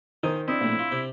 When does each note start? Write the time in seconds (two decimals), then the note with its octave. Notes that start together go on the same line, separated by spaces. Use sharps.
0.23 D#3 D#4 C5 G#5 D#6
0.48 C4 D4 E4 D#5
0.61 A#1 A2
0.79 F4
0.92 C3 G4